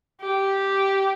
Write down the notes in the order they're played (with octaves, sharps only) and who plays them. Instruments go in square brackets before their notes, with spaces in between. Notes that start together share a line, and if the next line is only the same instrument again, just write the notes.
[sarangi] G4